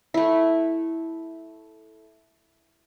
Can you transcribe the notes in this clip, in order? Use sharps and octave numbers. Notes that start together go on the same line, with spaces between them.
A3 E4